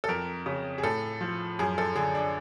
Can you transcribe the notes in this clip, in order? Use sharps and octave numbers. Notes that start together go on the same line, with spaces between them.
A4
F2 A#4
C#3
G#4
A2 A4
F3
F#2 G#4
A4
D3 G#4
D4